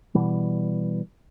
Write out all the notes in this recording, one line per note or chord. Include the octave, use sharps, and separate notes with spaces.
B2 E3 G3